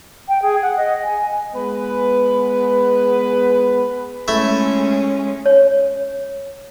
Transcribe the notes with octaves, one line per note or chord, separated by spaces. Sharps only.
G5
G#4
F#5
D#5
G#5
G#3 B3 B4
G#3 A3 C#4 E4 E5
C#5